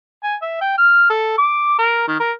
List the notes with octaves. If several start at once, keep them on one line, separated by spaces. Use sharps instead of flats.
G#5
E5
G5
F6
A4
D6
A#4
D#3
A#4